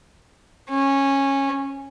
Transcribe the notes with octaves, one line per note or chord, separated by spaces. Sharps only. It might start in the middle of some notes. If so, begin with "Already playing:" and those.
C#4